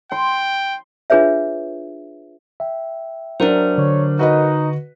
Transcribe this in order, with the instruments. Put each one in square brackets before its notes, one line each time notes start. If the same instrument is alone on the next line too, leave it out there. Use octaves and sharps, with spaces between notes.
[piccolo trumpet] G5 [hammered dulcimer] C6
[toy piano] D4 F4 G#4 B4 C#5 E5
[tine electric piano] E5 G5
[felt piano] F#3 D4 [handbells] A#4 C5
[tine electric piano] D3 [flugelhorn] C#5
[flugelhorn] D#4 [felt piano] F#4 B4 D#5